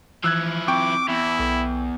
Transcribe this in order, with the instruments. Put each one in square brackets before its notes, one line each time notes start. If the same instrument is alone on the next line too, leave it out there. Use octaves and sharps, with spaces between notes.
[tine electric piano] E3 [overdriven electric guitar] F3 E4 [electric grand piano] E6 F#6 G#6
[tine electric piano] C4 [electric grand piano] G5 C#6 [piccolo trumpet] D6
[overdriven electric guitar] E2 [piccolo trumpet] E4
[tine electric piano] B1